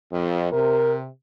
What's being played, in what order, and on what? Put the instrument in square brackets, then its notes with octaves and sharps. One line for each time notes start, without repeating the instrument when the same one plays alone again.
[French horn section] F2
[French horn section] C3 [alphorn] A#4